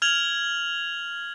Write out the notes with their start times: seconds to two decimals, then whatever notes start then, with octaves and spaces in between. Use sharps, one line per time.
0.02 F6 G#6 F7 F#7